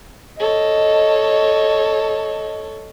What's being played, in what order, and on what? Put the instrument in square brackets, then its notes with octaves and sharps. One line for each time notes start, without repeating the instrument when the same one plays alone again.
[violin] A4 C#5 [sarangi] D#5